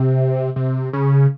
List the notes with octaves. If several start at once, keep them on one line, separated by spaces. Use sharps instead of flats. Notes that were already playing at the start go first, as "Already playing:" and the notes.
Already playing: C3
C3
C#3